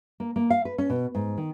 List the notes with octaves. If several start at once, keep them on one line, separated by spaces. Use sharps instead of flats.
A#3
A#3
F5
B4
C#4
B2
G#2
D#3